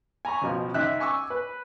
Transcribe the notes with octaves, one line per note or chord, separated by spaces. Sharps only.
G#5 A#5 B5 C#6
C#2 B2 F3
C#2 D#4 E5 F#6
G#5 C#6 D6 E6
B4